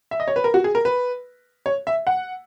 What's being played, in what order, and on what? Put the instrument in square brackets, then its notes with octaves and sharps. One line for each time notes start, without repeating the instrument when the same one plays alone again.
[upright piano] E5
D#5
C#5
B4
A#4
F#4
G#4
A#4
B4
C#5
E5
F#5